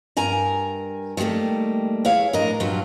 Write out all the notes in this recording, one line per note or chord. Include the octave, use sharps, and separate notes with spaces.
G2 A#4 G#5 A#5
D#3 F3 G3 A3 A#3
E4 G#4 C#5 F5
A2 D4 A#4 D#5
G2 A#2 F#3 F4